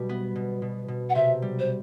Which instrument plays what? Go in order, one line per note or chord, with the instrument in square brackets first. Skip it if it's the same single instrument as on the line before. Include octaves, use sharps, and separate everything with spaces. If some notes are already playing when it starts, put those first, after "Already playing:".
Already playing: [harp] B2 G3
B3
B2
B2
B2
[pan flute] F#5
[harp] C3 [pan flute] E5
[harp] G3
[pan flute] C5